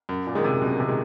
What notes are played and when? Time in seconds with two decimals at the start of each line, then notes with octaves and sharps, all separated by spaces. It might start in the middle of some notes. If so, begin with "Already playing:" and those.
0.09 F#2
0.27 A#2
0.35 D#3 G#3
0.44 C3
0.61 F#2 B2
0.80 C3
0.88 D#3 G#3